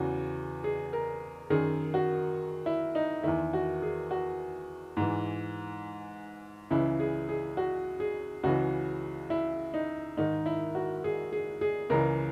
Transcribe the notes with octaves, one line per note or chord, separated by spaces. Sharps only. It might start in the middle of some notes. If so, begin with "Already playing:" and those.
Already playing: E2 C#3 E3 F#4
G#4
A#4
F#2 D#3 G#4
F#4
E4
D#4
E2 D#3 E4
F#4
G#4
F#4
G#2 E3
C#2 C#3 E3 E4
G#4
G#4
F#4
G#4
C#2 C#3 E3 F#4
E4
D#4
G#2 D#3 D#4
E4
F#4
G#4
G#4
G#4
C#2 C#3 E3 A#4